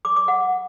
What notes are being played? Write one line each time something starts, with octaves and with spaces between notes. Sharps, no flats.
D6
D6
F#5